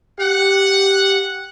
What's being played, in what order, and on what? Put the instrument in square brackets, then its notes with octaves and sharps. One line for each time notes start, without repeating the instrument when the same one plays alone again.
[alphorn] G4 [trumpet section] F#5